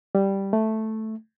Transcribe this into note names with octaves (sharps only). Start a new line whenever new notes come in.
G3
A3